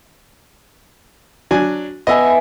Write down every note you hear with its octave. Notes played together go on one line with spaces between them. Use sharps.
F#3 D4 G#5
B3 D#5 E5 G#5